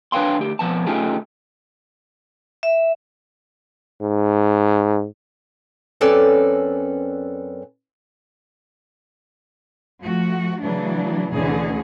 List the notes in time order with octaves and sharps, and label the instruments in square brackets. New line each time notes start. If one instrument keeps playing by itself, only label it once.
[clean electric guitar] D4 B4 C#5 F5 G5 C6
D2 G4
F2 B2 F3 B3 A5
C#3 A3 D#4 F4 G4 G#4
[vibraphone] E5
[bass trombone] G#2
[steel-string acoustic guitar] F#2 C4 C#4 A4 B4 D5
[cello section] F3 A3 F#4
C#3 E3 F#3 A3 D4
D2 B2 D3 E3 C#4 G#4